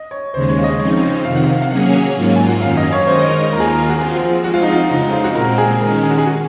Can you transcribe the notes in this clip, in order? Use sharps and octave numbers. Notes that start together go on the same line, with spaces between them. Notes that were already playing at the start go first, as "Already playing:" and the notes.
Already playing: D#5
C#5
D#2 C#3 G#3 C5
C#5
F5
D#5
C#3 F3 C4 D#4 C#5
F2 C3 D#3 F5
F#5
F5
F5
F#3 A#3 C#4 G#4 C#5 F#5
G#2 F#3 A#3 F4
G#5
F#5
F#2 D#3 F#3 C#4 F5
D#5
C#5
D#3 G#3 D#4 A#4 C5 D#5
D#2 D#3 A#3 F4 A#4
G#4
A#4
F#4
F3 C4 F4 G#4
F3 G#3 C4 F#4
F4
D#4
F4
F2 C#3 G#3 C4 D#4
D#4
F4
F#4
A#2 G#3 C4 A#4
G#4
D#3 G#3 C#4 A#4
G#4
F#4
G#4
F#4